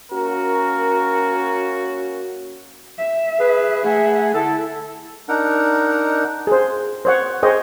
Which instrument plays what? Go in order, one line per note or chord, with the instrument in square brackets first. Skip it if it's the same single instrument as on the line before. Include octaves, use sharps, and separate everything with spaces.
[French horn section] A#3 C#4 F#4 [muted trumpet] A#4
[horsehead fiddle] E5
[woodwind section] G#4 B4
[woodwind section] A3 G#4 [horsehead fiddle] E5 F#5
[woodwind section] D3 A4 [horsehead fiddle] E4
[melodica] D4 D#4 A#4 F#5
[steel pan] G#4 C5
C5 C#5 F#5
G#4 C5 C#5 D#5 G5